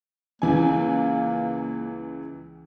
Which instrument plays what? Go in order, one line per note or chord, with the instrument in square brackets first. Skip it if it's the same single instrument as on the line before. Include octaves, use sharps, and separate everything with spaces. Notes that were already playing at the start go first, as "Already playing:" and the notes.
[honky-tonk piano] C#2 E3 G#5 [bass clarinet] A#3